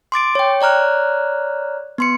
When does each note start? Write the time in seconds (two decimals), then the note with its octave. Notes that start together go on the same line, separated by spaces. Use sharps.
0.12 C6 D6 A6 D7
0.35 C#5 G5
0.61 C#5 D5 A#5 F6 F#6
1.98 B3 C6 C#7